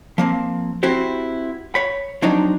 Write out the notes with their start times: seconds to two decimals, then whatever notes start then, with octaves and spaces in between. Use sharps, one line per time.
0.18 F3 A#3 C4
0.83 C4 E4 F#4 G4 C5
1.75 C#5 B5
2.22 F3 F#3 C4 D4 D#4